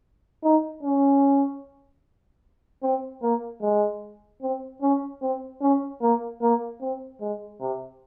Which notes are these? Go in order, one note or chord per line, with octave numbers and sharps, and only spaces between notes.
D#4
C#4
C4
A#3
G#3
C4
C#4
C4
C#4
A#3
A#3
C4
G#3
C3